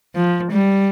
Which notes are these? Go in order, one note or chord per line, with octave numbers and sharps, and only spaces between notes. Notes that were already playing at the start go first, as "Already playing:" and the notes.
F3
G3